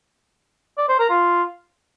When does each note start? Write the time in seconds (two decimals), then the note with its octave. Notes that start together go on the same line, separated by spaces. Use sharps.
0.78 D5
0.88 C5
0.99 A#4
1.10 F4